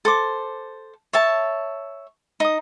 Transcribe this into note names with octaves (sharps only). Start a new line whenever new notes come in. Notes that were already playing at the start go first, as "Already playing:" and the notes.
A4 C5 D6
C#5 E5 A5
D#4 D#6